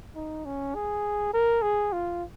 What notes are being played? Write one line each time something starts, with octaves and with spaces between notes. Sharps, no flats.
D#4
C#4
G#4
A#4
G#4
F4